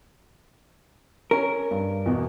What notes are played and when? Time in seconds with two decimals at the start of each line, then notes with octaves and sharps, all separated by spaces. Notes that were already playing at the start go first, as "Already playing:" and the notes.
1.31 C#4 A#4 C#5
1.71 G2
2.06 E2 B2